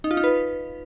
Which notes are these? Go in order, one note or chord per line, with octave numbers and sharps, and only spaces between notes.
D#4
F4
D#4
B4